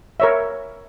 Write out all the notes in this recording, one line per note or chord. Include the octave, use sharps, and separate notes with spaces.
A#4 C#5 E5